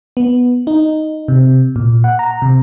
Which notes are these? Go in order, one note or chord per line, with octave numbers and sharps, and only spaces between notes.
B3
D#4
C3
A#2
F#5
A#5
C3